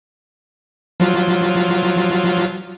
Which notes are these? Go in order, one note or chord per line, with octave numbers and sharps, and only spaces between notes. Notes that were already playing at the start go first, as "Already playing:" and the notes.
F3 F#3 F4